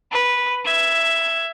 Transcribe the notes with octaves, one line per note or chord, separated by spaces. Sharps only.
B4
E5 G#6